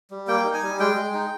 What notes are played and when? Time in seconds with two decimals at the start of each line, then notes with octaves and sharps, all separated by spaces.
0.10 G3
0.27 A#3 G5
0.45 D#4
0.54 G#5
0.62 G3
0.79 G#3 G5
0.97 G#3
1.14 D#4